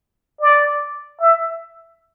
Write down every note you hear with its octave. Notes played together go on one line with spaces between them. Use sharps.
D5
E5